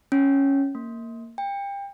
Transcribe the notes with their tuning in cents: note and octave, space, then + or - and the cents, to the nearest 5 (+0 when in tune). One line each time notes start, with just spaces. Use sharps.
C#4 -5
A#3 -15
G5 +30